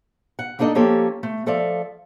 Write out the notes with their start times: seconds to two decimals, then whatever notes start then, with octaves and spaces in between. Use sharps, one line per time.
0.39 F#5
0.59 A#3 D4 D#4 A4 D#5
0.75 F3 A#3 C#4 G4 A4
1.23 A3
1.46 F3 A4 D5 E5 F5